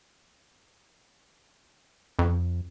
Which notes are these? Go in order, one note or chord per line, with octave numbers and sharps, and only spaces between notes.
F2